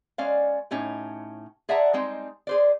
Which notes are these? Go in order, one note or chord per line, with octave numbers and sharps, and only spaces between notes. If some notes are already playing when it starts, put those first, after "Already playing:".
G#3 C#4 D5 F5
A2 C#4 D#4 G4
G#4 D5 E5 F#5 A5 A#5
G3 G#3 C4 D#4
G#4 C5 D5